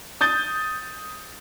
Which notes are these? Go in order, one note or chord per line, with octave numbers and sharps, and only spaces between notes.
D#6 G6 A6 G7